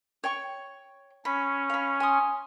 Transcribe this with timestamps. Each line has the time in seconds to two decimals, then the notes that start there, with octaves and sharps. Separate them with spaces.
0.24 C#5 G5 C#6
1.25 C#4 B5
1.70 F5 B5
2.00 G#5 C6 D#6